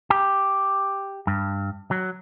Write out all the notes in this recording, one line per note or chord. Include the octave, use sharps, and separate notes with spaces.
G4
G2
F#3